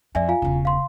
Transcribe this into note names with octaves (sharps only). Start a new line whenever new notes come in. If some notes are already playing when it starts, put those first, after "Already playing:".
F2 D5 E5 G#5
F4 F5 G#5
E1 C#3
F5 C6